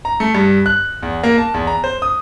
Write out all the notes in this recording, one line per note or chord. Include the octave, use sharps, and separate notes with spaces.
A#5
A3
G2
F#6
E2
A#3
A5
E2
A#5
C5
D#6